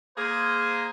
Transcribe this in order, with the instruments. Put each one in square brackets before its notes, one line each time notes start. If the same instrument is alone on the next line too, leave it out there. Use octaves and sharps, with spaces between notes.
[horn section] A#3 G#4 C5